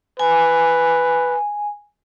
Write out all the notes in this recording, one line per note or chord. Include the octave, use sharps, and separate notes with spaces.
B4 G#5